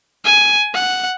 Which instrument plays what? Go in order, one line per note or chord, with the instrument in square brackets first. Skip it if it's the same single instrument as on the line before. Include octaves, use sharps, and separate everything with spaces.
[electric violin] G#5
F#5